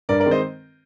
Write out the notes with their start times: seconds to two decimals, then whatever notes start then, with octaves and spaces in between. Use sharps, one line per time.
0.09 G2 A#4 D5
0.20 A#4 D5
0.26 D#3 G#3 C4
0.31 C5 D#5